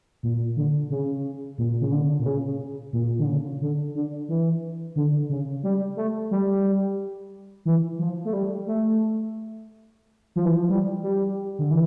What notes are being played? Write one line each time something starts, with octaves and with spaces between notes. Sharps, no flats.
A#2
D3
C#3
A#2
C#3
D3
A#2
C#3
A#2
D3
C#3
D3
D3
E3
D3
C#3
G3
A3
G3
E3
F3
A3
G3
A3
F3
E3
F3
G3
G3
D3
E3